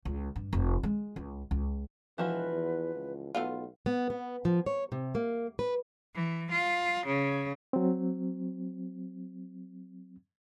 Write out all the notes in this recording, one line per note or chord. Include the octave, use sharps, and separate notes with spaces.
C#2
G2
F1
G#3
C#2
C#2
E1 E3 F3 F#4 B4
E2
C#2
B1 A3 B3 F4
B3
B3
F3
C#5
C3
A#3
B4
E3
F4
C#3
F#3 C4